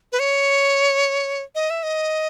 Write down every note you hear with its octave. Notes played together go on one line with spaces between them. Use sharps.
B4
C#5
D#5
E5
D#5